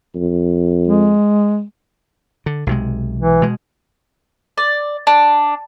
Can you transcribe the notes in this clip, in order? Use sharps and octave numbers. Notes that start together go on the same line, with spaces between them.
F2
G#3
D3
B1 C3 G#3
E3
B2 G#3
D5
D4